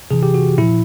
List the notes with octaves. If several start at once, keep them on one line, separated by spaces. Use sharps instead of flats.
C3 E3 G#4
G4
F#4
A#2 F3 E4